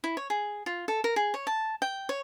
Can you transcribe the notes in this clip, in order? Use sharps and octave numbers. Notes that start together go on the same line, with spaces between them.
E4
C#5
G#4
F4
A4
A#4
G#4
C#5
A5
G5
C#5